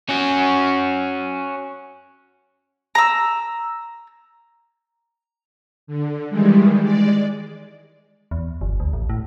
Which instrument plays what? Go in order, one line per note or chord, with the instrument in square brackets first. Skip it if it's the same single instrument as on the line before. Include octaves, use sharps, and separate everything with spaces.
[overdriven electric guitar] C#4 F#4
[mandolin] A#5 E6
[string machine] D3
D#3 E3 G3 G#3
G#3 D5
[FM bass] E2
G1
D2
A1
A2